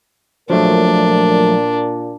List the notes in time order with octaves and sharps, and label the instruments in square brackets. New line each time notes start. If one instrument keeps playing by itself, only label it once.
[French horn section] A#2 A#4 [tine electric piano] F3 F#3 A3 [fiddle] D4